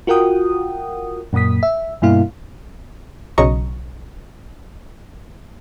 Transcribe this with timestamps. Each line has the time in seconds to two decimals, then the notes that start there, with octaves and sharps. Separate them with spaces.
0.07 F4 F#4 A#4 F#5 G5 D#6
1.33 F#2 A#2 A#3 D#6 B6
1.63 E5
2.02 G2 B2 A#3 E4 F5
3.38 B1 C#3 F#3 D#5 A#5 C#6